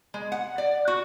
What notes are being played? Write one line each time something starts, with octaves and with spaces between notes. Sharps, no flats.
G#3
F#5
D5
F#4